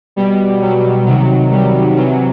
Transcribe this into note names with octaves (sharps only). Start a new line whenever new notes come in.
B2 G3
F#3
C3 D#3 F#3
G3
C3 E3 F#3